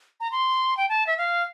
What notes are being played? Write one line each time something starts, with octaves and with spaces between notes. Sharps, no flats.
A#5
C6
G5
A5
E5
F5